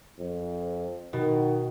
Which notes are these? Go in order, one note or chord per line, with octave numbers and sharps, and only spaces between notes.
F2
B2 D#3